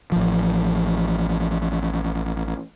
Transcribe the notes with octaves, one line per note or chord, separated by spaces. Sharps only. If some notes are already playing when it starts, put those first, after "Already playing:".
A1 F3